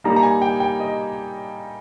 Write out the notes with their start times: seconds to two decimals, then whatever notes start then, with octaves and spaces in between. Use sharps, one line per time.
0.04 A#2 G3 A#3 D#4 A#5
0.16 A#5
0.23 G#5
0.42 G5
0.60 G5
0.80 D#5